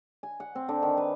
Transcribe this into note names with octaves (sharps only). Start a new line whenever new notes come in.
G#5
F#5
C4
D3
D#3
B4